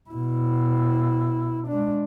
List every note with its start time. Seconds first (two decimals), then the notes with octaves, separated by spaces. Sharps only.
0.10 B2 E4
1.68 G#3 D4